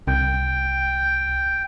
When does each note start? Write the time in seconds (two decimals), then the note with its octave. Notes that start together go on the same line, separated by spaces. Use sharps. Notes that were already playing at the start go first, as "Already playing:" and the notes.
0.07 C2 G5